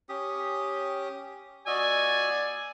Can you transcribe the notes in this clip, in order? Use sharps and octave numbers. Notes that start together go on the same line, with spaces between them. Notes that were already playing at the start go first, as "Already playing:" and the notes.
C#4 G4 D#6
F#4 D5 D#5 G#5 E6